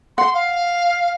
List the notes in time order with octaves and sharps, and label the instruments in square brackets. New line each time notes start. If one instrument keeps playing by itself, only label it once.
[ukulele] F#5 [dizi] C6
[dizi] F5